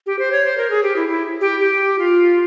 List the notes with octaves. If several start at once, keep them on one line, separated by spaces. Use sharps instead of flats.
G4
C5
C#5
C5
A#4
G#4
G4
E4
E4
G4
G4
F4